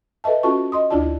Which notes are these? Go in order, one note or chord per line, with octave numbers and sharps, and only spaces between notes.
A4 B4 D#5 E5 A5
C#4 F4 F#4 A4 A5 C#6
D#5 C6 D#6
D2 D4 E4 F4 D5 A5